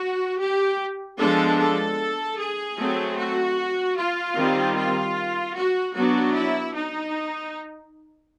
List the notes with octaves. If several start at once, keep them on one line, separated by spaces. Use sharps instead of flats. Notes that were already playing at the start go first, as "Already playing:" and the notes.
Already playing: F#4
G4
F3 G#3 B3 D4 A4
A4
G#4
F#3 A3 C4
F#4
F4
D#3 G3 C4
F4
F#4
F#3 B3 D4 F#4
E4
D#4